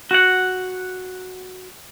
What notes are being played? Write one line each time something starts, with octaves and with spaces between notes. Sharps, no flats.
F#4 F#5